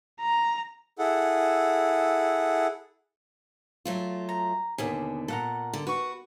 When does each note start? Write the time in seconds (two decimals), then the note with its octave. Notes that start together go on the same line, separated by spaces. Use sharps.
0.21 A#5
0.99 E4 G#4 A4 F#5
3.85 F#3 A3 F4
4.29 A#5
4.78 D#2 B2 D3 G#4
5.28 A#2 A4 F#5 A#5
5.73 D3
5.87 F#4 B4 C#6